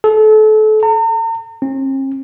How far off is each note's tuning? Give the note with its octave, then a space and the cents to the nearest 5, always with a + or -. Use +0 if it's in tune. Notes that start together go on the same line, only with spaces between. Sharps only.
A4 -30
A#5 -45
C4 +45